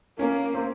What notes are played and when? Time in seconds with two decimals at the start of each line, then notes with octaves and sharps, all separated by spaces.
0.19 A#3 C#4
0.55 C4